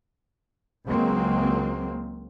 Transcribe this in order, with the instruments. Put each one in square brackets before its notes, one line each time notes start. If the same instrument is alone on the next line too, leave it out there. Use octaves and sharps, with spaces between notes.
[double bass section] C#2 F#3 G#3 A#3 C4